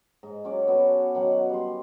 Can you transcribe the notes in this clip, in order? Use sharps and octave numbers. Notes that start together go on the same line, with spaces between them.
G#2
F#3 C#4 C#5 D5
B3 F#4 A4
D#3 F#3 F#5
G3 C6